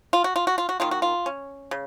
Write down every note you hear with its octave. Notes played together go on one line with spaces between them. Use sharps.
F4
F#4
F4
F#4
F4
F#4
D#3 A#3 F4
F#4
F4
C#4
C#3